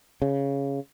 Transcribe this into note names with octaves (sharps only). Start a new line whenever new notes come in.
C#3